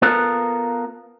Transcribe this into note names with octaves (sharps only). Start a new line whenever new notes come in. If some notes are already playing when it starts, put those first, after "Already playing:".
B3 F4 A4 A#4